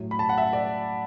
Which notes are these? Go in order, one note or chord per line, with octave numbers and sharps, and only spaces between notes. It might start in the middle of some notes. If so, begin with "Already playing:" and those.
Already playing: A2 F#3
B5
A5
F#5
E5
D5